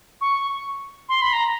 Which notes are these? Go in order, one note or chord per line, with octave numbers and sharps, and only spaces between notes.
C#6
C6
B5
A#5